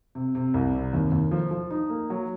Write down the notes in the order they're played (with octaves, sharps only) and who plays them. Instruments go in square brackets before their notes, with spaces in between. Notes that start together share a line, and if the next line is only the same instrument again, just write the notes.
[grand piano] C3
C3
C2
C3
D#2
D#2
F3
F3
D#4
A#3
F#3